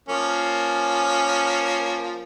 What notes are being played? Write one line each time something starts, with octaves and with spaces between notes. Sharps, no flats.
F3 A#3 C#4